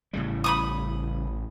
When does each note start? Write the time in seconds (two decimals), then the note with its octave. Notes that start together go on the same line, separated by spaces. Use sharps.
0.13 A1 A2 C#3 G3
0.44 B5 C#6 D#6